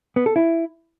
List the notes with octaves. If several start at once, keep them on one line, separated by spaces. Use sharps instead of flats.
B3
A4
E4